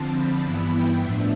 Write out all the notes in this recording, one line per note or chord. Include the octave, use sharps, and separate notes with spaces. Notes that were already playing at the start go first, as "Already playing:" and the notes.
Already playing: D3 F3 C4 A5
B5
G2 E3 B3 E4
G5
A2 F3 B3 D4 E5